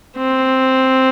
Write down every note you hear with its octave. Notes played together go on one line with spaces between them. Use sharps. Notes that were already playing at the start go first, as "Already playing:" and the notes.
C4